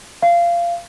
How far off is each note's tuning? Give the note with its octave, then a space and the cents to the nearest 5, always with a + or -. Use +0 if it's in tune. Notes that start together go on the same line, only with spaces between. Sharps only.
F5 -20